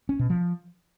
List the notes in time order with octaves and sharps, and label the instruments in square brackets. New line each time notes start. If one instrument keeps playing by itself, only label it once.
[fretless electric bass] C#4
B2
F3